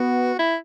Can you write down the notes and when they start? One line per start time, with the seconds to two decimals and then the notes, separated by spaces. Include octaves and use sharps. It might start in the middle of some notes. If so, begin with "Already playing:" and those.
Already playing: B3 F#4
0.39 E4